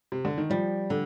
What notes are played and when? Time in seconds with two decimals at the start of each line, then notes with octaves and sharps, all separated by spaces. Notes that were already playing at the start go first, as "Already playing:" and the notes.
0.12 C3
0.25 D3
0.38 D#3
0.50 F3 G3
0.90 D3